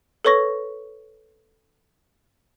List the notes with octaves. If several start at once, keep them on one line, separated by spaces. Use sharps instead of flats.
A4 B4 C#5 C#6 A#6